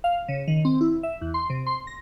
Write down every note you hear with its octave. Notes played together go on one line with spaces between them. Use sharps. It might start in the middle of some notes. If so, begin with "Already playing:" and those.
F5
C#3
D#3
C4
E4
E5
E2
C6
C3
C6
A#6